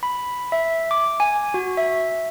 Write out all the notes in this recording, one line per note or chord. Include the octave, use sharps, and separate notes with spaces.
B5
E5
D6
G#5
F#4
E5